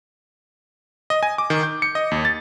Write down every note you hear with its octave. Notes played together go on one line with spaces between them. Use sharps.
D#5
G#5
D6
D#3
G6
C#7
D#5
D#2
A6